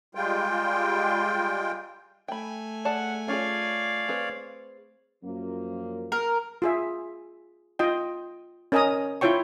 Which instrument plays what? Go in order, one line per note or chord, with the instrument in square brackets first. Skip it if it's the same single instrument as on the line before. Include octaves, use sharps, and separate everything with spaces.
[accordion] G3 G#3 F4 G5
[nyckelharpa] A3 G#5 [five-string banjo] G5 B5
[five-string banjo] G#4 D5 A5 [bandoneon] F#5
[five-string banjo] C#4 F4 G#4 [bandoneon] C#5 D5 F5
[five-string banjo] C4 G#4 B4
[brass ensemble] F#2 F3 A#3
[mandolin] A#4
[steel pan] F4 G#4 E5
F4 D#5 G5
C#4 A#4 D#5 G#5 A#5 D#6
E4 F4 C#5 G5 C#6